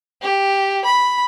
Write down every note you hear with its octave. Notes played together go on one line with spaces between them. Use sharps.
G4
B5